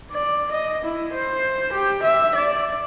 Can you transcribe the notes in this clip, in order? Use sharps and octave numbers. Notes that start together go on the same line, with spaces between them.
D5
D#5
E4
C5
G4
E5
D5